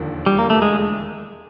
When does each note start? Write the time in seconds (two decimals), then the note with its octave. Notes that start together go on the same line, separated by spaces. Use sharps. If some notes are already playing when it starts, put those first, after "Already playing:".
Already playing: E1 D#2 D3 F3
0.26 G3
0.39 A#3
0.50 A3
0.62 G#3